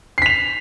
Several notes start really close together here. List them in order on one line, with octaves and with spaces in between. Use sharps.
C7 B6 F7